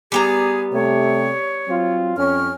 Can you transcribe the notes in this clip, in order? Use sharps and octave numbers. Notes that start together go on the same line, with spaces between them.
G3 B3 G#4 A#5
C3 A3 C#5
F#3 C4 F4
F2 C#4 F6